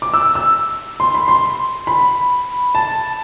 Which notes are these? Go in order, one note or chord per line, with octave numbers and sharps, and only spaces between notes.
D6
E6
E6
C6
B5
C6
B5
A5